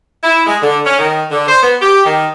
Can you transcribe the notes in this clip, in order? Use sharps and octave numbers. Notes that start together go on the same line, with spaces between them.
E4
G#3
D3
C#4
D#3
D3
C5
B3
G4
D#3